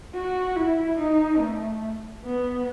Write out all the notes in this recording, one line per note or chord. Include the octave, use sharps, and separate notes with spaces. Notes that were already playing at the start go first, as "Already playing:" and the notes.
F#4
E4
D#4
A3
B3